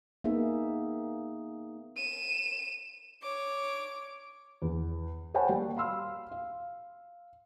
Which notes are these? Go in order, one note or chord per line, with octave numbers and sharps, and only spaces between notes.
A#3 B3 D#4 G#4 E5
D#7 E7
C#5 D6
E2
C5 C#5 F#5 G5 A5 B5
G3 A#3
F5 B5 C6 E6 F6
F5